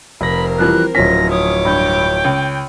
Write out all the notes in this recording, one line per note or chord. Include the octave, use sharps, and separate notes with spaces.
F1 C4 A#4 B5 A#6
E3 F3 G3 F#6
D1 F3 C#4 A#6 B6
C#5 D6 D#6
G2 G5
C#2